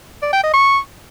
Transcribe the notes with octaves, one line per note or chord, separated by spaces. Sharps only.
D5
G5
D#5
C#6